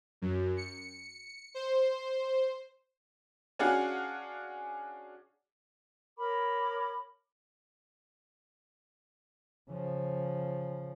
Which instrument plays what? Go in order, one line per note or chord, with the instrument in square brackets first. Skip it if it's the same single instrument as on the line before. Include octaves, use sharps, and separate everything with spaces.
[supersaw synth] F#2
C#7
C5
[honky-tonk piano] C#4 D4 F#4 G#4 F5 F#5
[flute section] A#4 C#5 B5 D6
[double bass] C#3 F3